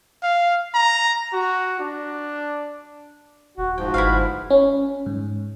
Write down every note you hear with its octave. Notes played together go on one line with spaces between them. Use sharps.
F5
A#5
F#4
D4
D#1 F#4
G#2 F3 F#4 G5
G1 E4 B4 F5
C#4
G#2